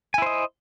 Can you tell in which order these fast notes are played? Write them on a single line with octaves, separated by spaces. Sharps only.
G#5 E4 C5 D#5